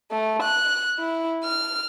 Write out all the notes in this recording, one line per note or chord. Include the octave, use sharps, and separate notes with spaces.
A3
F#6
E4
F6